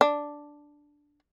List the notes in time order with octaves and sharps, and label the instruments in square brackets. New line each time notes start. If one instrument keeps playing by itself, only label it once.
[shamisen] D4